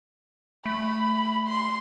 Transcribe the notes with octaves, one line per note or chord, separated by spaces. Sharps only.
A3 B5
C6